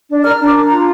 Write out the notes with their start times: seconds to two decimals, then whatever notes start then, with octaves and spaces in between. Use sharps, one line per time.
0.09 D4
0.24 A#4 F6
0.40 D4
0.45 D6
0.55 D4
0.66 A#5
0.71 F4